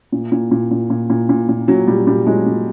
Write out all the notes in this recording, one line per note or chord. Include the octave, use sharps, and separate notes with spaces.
A#2
A#2
A#2
A#2
A#2
A#2
A#2
A#2
A#2 F#3
A#2 G3
A#2 G3
A#2 F#3 G#3
A#2